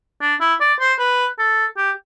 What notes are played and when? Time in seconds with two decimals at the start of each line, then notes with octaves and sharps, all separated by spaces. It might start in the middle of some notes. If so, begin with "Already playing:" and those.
0.21 D4
0.40 E4
0.60 D5
0.80 C5
0.99 B4
1.39 A4
1.77 G4